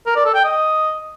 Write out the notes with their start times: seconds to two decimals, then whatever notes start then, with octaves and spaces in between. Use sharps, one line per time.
0.06 A#4
0.16 D5
0.25 A4
0.35 G5
0.44 D#5